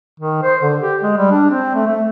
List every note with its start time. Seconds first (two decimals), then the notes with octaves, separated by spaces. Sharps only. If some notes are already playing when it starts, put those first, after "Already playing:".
0.20 D#3
0.43 C5
0.61 D3
0.82 G4
1.03 G#3
1.17 G3
1.31 D4
1.50 C4
1.75 A3
1.87 A3